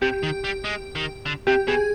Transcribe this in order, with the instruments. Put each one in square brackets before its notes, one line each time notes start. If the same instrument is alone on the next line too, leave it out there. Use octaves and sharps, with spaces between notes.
[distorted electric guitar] C3 [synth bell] G4
[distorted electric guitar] D#3
G3
G#3
D#3
D3
[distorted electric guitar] C3 [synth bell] G4
[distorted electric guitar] B2 [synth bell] G#4